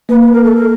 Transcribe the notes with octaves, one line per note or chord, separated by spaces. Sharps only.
A#3 B4
B4
A#4
A4
A#4